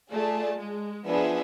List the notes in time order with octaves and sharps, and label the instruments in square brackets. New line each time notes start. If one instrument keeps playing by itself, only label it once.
[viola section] A3 [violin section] F4 G#4 D5 A5
[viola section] G#3
[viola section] F3 [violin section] B3 D4 G#4 B4 E5